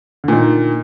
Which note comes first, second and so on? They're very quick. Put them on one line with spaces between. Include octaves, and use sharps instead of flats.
D3 A#2 D#3